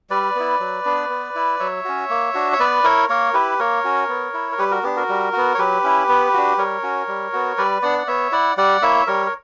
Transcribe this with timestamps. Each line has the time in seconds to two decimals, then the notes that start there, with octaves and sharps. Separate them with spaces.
0.10 G3 B4 D5
0.35 B3 E4
0.60 F#3
0.85 B3 D4
1.09 B3
1.35 E4
1.60 F#3 C#5 E5
1.85 C#4 F#4
2.10 A#3
2.34 D4 F#4
2.52 C#5
2.60 B3 B4 D5
2.84 E4 A#4 C#5
3.09 A#3 A#4 C#5
3.34 E4 G4 B4
3.59 A#3 A#4 C#5
3.84 C#4 F#4
4.09 B3
4.34 E4
4.52 A#4
4.58 G3 G4 B4
4.71 F#4 A#4
4.83 B3 D4 G4
4.96 F#4 A#4
5.09 G3
5.33 B3 F#4
5.55 C#5
5.58 F#3 G4 B4
5.84 C#4 E4
6.08 B3
6.34 D4 F#4
6.58 G3 A#4 C#5
6.83 C#4 F#4
7.08 G3
7.33 B3 F#4
7.58 G3 B4 D5
7.82 B3 D4 D5 F#5
7.98 F#5
8.07 B3 C#5 E5
8.32 E4 D5 F#5
8.57 G3 D5 F#5
8.82 A#3 E4 C#5 E5
9.07 G3 A#4 C#5
9.26 A#4